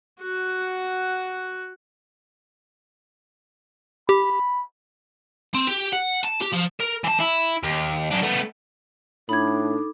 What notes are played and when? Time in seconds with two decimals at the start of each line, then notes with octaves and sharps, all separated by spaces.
0.21 F#4 F#5
4.09 G4 B5
5.54 C4
5.67 G4
5.92 F#5
6.24 A5
6.41 G4
6.52 F3
6.80 A#4
7.04 E3 A5
7.20 E4
7.63 D#2
8.11 F#2 D4
8.22 A3 B3
9.29 A2 D4 D#4 A4 B5 D6 G#6